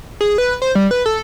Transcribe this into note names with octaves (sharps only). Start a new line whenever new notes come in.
G#4
B4
C5
G3
B4
A4